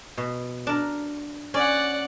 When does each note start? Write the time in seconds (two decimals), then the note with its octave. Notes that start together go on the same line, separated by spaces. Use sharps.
0.18 B2
0.67 D4 A#4
1.54 C#4 D5 F#5